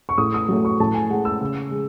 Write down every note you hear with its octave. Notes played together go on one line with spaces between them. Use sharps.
C#6
A2 D#6
D#6
F#3 A3
C#6
A2 A5
G#5
G#3 F#5
E6
C#3
G#3